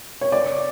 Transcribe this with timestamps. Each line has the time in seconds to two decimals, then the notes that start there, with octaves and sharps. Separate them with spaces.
0.21 C#5
0.32 D5